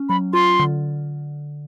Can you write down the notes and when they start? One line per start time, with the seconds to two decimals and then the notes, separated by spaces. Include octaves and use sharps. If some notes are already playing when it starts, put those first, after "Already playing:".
Already playing: C#4
0.09 F#3 B5
0.33 F4 C6
0.60 D3